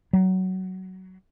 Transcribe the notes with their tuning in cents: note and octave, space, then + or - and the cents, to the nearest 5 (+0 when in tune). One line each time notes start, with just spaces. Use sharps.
F#3 +15